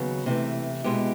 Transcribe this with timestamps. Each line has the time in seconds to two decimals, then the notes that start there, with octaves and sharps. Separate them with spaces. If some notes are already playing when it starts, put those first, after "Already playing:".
Already playing: D#2 C#3 F#3 B3
0.26 C3 E3 A3
0.84 B2 G#3 B3 E4 G4